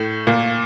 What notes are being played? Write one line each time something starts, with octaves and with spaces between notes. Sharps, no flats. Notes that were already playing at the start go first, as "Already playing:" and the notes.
Already playing: A2 A3
A#2 A#3